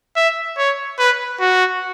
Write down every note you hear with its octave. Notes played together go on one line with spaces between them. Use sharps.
E5
C#5
B4
F#4